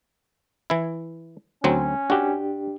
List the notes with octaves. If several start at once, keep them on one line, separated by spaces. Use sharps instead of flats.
E3 E4
D2 F#3 C4 C#4
D4 F#4 G4